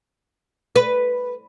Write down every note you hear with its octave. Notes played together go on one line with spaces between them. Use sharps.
B4